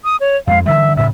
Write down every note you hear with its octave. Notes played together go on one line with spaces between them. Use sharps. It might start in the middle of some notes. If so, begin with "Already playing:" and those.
D#6
C#5
F2 G#3 F5
D3 E3 G3 E5
D2 A2 C#3 E5